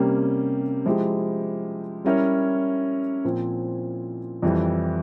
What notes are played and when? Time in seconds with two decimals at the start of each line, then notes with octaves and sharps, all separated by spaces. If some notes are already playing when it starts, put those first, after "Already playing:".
Already playing: C3 G3 A#3 C#4 G4
0.86 F3 G#3 E4 G4
2.04 G3 C#4 E4 A#4 C#5
3.25 A#2 F3 C4
4.42 F2 E3 G3